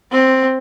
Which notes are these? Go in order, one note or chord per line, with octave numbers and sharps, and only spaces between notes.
C4